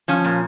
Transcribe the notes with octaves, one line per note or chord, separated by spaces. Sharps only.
F3 C#4
A#2